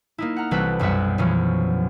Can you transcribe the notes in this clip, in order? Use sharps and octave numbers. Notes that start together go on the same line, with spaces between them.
A#3 D#4 E4
F#5 A#5 F6
C2 E3 C4 F#4 A4 B4
B1 F#2 G3 E5 F#5
F#2 B2 E3 F3 C#4